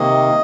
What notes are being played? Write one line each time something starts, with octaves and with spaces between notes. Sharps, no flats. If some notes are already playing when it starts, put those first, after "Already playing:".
Already playing: C3 D#3 A#3 D#5